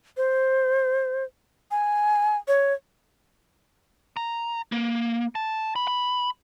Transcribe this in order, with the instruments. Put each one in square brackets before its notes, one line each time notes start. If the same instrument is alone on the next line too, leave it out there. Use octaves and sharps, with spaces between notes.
[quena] C5
G#5
C#5
[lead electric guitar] A#5
A#3
A5
B5
B5